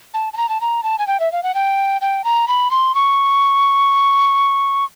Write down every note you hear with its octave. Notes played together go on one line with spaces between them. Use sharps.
A5
A5
A#5
A5
A#5
A5
G#5
G5
E5
F5
F#5
G5
G5
A#5
B5
C6
C#6